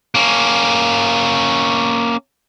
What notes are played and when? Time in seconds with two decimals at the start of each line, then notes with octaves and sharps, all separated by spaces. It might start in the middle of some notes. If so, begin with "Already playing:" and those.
0.15 A#3 C#4